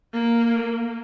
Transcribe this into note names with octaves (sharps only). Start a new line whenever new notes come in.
A#3